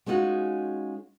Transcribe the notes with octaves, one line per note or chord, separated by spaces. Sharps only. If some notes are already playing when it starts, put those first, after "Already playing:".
G#3 C#4 D#4 F4 F#4